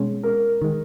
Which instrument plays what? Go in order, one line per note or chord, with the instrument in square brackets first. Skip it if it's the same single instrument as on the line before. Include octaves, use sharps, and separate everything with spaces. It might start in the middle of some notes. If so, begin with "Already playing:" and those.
Already playing: [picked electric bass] B2 G#3 C#4
[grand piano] A#4
[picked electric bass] D#3 G#3